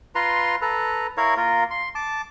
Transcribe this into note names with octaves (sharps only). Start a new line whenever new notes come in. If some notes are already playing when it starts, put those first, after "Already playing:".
F4 B4 A#5 C6
A4 B4 A#5
E4 A#4 C#5 F5
A#3 F4 A#4
C6
A5 D6